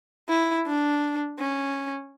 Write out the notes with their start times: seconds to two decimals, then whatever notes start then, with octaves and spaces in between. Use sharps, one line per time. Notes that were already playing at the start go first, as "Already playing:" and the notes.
0.29 E4
0.66 D4
1.39 C#4